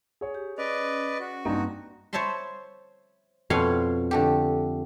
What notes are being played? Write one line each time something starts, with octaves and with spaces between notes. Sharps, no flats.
G#4 C#5
G4
C#4 B4 D5 D#5
F#4
G2 A#3 C4 D#4
C5 C#5 E5 A5 B5 C6
F2 B2 C#5 F5 B5 C6
D3 A3 G4